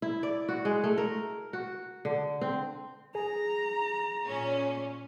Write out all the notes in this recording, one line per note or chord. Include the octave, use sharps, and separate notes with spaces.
E4
D5
F#4
G#3
A3
A#4
F#4
D3
C4
G#4 A#5
A#2 C#4